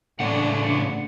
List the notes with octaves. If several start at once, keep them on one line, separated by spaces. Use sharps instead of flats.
A2 C#3 A3 D4 F#5